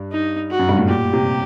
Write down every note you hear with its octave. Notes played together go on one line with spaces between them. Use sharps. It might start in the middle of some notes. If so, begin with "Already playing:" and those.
Already playing: G2
D#4
F#4
F#2
G2
A2
A#2 G4
C3